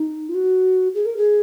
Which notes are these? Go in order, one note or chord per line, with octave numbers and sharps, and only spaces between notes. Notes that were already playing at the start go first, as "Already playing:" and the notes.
Already playing: D#4
F4
F#4
G#4
A#4
G#4